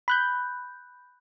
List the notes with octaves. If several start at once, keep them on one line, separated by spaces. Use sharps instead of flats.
B5 F#6 G6